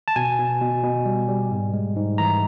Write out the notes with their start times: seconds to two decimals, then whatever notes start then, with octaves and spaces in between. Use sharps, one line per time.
0.08 A5
0.16 B2 G#5
0.38 B2
0.61 B2
0.83 B2
1.06 G3
1.29 G3
1.51 G#2
1.73 G#3
1.96 G#2
2.18 E3 A#5